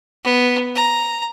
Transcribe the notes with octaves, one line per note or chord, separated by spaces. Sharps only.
B3
A#5